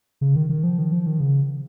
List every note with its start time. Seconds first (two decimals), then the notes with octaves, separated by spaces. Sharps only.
0.21 C#3
0.36 D#3
0.49 D#3
0.63 F3
0.78 D#3
0.92 F3
1.07 D#3
1.20 C#3